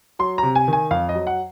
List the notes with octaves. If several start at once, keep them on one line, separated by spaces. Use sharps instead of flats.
F#3 C6
C3 A#5
G#5
D#3
G#5
F2 F5
D#5
F#3
F#5